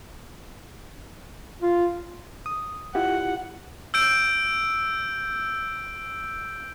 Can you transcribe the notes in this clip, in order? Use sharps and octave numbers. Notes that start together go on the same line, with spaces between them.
F4
D#6
E4 F4 G4 F#5
E6 G6 D7